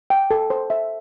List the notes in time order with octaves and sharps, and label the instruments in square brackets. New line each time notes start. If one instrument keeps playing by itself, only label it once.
[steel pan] G5
A4
C5
E5